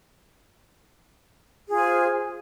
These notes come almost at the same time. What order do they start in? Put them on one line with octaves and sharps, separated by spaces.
G#4 F4 G#5 C5